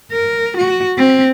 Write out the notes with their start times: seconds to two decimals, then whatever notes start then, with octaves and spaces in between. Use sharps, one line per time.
0.12 A#4
0.58 F#4
0.98 C4